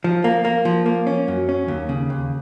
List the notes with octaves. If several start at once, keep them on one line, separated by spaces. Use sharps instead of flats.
F3
A#3
A#3
F3
A#3
C#4
F#2
C#4
D#2
C#3
D#2